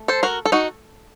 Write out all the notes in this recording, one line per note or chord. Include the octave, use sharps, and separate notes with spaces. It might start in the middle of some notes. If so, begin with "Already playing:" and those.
Already playing: A3
A4 C5
F#4 A#4
A4
D#4 F#4